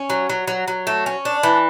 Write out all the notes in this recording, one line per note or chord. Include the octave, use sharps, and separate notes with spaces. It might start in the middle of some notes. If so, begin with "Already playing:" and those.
Already playing: C#4
F#3
F#3
F#3
F#3
A3
C#4
D4
E3